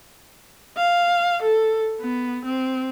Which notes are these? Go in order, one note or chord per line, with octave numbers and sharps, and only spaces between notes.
F5
A4
B3
C4